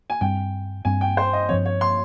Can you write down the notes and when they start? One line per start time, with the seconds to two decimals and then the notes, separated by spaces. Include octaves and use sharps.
0.10 G#5
0.21 G2 G3 C4 G5
0.85 G2 G3 C4 G#5
1.01 G5
1.17 C5
1.33 D#5
1.49 G2 F3 C4 C#5
1.66 C#5
1.81 C6